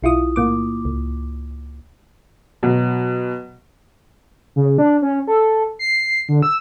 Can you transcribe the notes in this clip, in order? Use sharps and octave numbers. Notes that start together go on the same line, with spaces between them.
B1 E4 F4 D#6
A2 A#3 D6
C#2
B2 F#3
C#3
D4
C#4
A4
C7
D3
E6